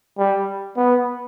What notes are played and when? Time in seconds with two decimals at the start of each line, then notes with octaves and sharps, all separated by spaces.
0.18 G3
0.77 B3